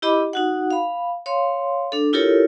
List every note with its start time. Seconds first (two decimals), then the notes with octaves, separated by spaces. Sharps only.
0.02 E4 G4 D#5 B5 D6
0.33 D#4 F#4 F#5
0.71 F5 B5
1.26 C#5 F5 C6
1.92 D4 A4
2.13 E4 F4 G4 A4 A#4 C#5